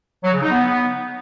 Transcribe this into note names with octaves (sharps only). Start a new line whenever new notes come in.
F#3
C#3
D#4
B3